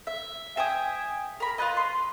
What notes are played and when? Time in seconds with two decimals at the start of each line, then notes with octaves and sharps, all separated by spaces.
0.07 E5
0.57 E5 G5 G#5 D#6
1.40 A#4 B5
1.58 F4 B4 D#5
1.77 C6